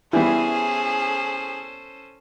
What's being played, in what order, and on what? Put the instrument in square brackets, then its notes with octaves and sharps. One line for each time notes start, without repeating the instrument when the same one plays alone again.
[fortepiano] E3 G3 B3 [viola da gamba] C#4 A4 C5 [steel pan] E4 [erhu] G#4